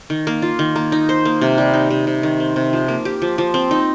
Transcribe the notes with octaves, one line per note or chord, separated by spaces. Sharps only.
D#3
A#3
F4
D#3
A#3
D#4
C5
A#3
C3
G3
D#4
C3
C3
D#3
C4
C3
F3
A#3
G4
F3
F3
C4
D#4